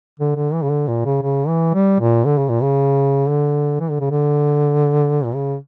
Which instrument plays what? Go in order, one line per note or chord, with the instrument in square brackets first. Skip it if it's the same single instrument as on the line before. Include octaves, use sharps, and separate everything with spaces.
[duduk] D3
D3
E3
C#3
D3
A#2
C#3
C#3
E3
G3
A#2
D3
C#3
A#2
C#3
D3
E3
D3
C#3
D3
A#2
C#3